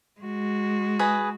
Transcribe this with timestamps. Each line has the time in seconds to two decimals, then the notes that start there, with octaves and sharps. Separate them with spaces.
0.20 G#3 F#4
0.99 G#4 B4 D#5